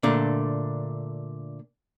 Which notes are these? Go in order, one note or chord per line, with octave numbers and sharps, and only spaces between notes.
A#2 D3 A3 D4